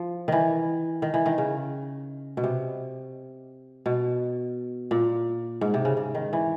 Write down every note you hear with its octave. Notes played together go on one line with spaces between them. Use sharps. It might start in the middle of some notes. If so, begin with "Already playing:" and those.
Already playing: F3
D#3 E3
D#3
E3
D#3
C#3
B2
C3
B2
A#2
G#2
C3
C#3
C#3
D#3
E3